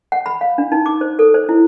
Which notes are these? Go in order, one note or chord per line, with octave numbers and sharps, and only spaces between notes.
F#5
B5
F5
D4
D#4
D6
C5
A4
C5
E4